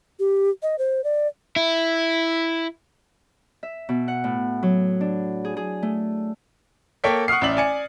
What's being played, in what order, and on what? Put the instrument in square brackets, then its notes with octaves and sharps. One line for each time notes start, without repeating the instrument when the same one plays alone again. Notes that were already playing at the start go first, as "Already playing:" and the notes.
[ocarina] G4
D#5
C5
D5
[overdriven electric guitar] E4
[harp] E5
B2
F#5
A2
F#3
D4
G#4
G#4
A3
[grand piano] A#3 A4 C#5 G5 B6
F#5 C#6 D#6 F6 C7
A1 D5 E5 F#7
D5 G#5 C#7